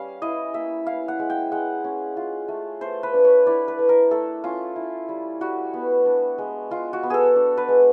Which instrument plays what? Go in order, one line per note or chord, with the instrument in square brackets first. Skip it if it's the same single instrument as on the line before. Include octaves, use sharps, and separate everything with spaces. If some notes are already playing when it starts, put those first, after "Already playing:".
Already playing: [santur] G3 C#4 F5
E4 D#5
A#3 E5
E4 F5
F#5
G#3
G5
G#3 F#5
C#4
F4
A3
A3 C5
B4
D4
C#5
E4 D5
B4
A3
A#4
A3 A4
C#4 F4
E4
G3
G3 F#4
B3
D4
G#3
G#3 F4
F#4
B3
G#4 A4
D4
B4
G#3